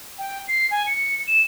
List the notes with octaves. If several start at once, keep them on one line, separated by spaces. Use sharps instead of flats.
G5
C7
G#5
C#7
E7